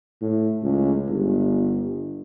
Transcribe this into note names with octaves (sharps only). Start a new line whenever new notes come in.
A2
C#2
G1